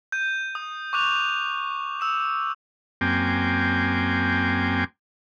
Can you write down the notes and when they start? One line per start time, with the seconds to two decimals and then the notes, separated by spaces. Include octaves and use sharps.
0.12 G6 D#7
0.55 D#6
0.93 C#6 D6 F#6 F7
2.00 E6 E7 F7
3.01 F#2 A#3 C4 G5 G#5 D6